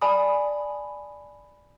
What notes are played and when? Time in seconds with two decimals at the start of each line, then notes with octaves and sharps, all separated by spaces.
0.01 D5 G#5 A5 B5 D#6